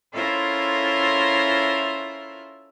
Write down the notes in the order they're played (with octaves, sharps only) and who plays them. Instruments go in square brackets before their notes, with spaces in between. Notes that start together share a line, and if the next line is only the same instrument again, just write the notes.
[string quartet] C#4 E4 F4 A4 A#4 C5